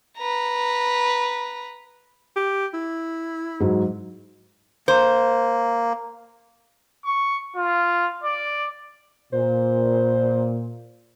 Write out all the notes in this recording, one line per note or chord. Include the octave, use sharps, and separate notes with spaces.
B4 A#5
G4
E4
G#2 F#3
A#3 C5
C#6
F4
D5
A#2 C5